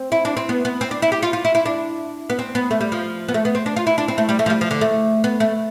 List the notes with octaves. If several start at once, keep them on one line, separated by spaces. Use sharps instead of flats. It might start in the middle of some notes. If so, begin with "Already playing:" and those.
Already playing: C4
E4
D4
C4
B3
B3
C4
D4
E4
G4
F4
F4
E4
E4
D4
B3
C4
B3
A3
G3
F3
B3
A3
B3
C4
D4
F4
E4
D4
C4
A3
G3
A3
F3
G3
F3
D3
A3
B3
A3